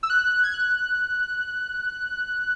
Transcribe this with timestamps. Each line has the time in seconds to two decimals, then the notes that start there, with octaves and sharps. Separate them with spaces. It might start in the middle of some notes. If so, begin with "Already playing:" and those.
0.03 E6
0.10 F#6
0.44 G#6
0.54 F#6